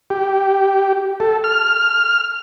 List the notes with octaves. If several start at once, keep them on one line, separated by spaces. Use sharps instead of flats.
G4
A4
F6